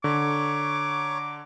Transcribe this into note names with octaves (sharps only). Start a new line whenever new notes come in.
D3 C#5 A#5 C#6 D6